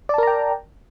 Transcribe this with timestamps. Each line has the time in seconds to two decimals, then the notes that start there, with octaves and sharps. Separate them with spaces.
0.09 D5
0.14 A5
0.18 A#4
0.23 A#5
0.27 G5